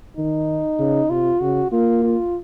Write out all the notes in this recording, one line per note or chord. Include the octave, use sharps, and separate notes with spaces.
D#3 D#4
C#3
C3 F4
C#3 F#4
A#3 F4
F4